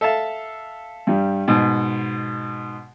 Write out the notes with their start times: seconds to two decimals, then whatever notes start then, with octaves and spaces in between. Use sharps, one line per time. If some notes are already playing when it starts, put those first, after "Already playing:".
0.01 A4 E5 F5 A5
1.07 G2 G3
1.48 G#2 B2